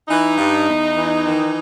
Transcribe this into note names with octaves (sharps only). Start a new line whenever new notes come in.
E3 D#4
G2
E2
E3
D#3